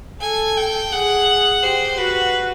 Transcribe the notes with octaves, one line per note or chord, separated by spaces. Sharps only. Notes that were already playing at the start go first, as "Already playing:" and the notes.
A4 G#5
G5
G#4 F#5
G4 C5
F#4 B4